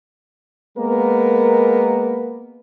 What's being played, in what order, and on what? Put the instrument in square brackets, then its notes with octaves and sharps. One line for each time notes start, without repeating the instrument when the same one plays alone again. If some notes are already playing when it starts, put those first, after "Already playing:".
[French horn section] G#3 A#3 B3 A#4